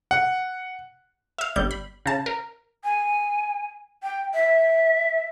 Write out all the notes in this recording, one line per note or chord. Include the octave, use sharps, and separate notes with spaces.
F#5
E5 F5
G1 G3 G6
B5
C#3 A5
A#4
G#5
G5
E5